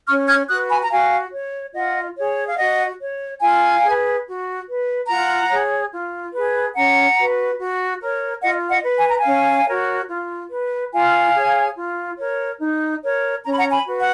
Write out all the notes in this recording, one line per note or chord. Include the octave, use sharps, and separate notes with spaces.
C#4 C#6 F6
F6 G#6
F#4 B4 D#6 F#6
G#5 B5
A#5
F#4 F5 G#5
C#5
F4 D#5 F#5
G#4 C#5
F5
F#4 D#5 F#5
C#5
F4 F5 G#5
G#4 B4
F#4
B4
F4 F#5 A#5
G#4 C#5
F4
G#4 B4
C#4 F#5 A#5
F#4 B4
F#4
A#4 C#5
F4 D#5 F#5
D#5 F#5
B4
G#5
A#5
F5 G#5
C#4
F#4 A#4 C#5
F4
B4
F4 F5 G#5
G#4 C#5
F4
A#4 C#5
D#4
A#4 C#5
C#4 A#5
B5
F#5 A#5
G#5 B5
F#4 B4
F#5